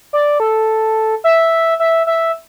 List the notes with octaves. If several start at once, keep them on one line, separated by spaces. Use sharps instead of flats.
D5
A4
E5
E5
E5